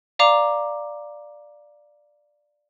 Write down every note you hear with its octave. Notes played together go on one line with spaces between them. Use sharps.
D5 F5 A#5 D6